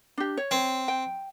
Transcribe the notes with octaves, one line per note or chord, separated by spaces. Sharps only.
D4 G4
C#5
C4
G5